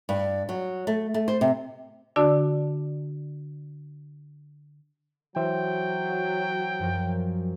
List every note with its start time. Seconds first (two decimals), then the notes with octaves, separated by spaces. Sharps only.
0.09 G2
0.49 F#3
0.87 A3
1.14 A3
1.28 C5
1.41 C3
2.16 D3 D4 F#4 D5 A5 E6
5.36 E3 F#3 C5 E5 G5
6.79 F#2 F3 A#4